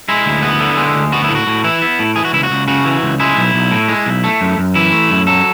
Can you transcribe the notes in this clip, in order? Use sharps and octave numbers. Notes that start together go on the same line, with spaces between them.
G#3 E4
D2
B3
D3
G#3
D2
B3 F#4
E4
A2
F#4
A2
E3 E4
B3
A2
E3 G#4
F#4
C#2 E4
F#4
C#2
C#3 F#4
E3
C#2
G#3 E4
B1
B1
A2
G#3
B1
A3
F#2
F#2
E3 E4
A3
F#2
F#3 A4